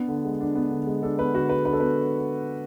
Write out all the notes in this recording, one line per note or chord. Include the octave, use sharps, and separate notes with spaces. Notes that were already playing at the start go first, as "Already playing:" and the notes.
Already playing: B3 D4
D3
G#3
D4
B3
D3
G#3
D4 A4
B3 B4
D3 F#4
G#3 B4
D4 B4
A4
B3 B4